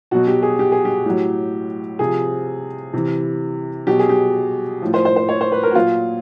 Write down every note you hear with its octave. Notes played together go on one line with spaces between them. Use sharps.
B2 F#3 F#4
G4
G#4
G4
G#4
G4
A2 F#3
C3 F3 G#4
C3 E3
B2 F#3 G4
G#4
G4
A2 F3
C5
C5
C5
C#5
C5
B4
A#4
F#4
A#2 F#3 F4